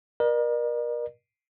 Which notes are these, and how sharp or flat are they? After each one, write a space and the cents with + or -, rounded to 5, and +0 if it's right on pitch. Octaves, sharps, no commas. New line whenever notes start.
A#4 +35 D5 +45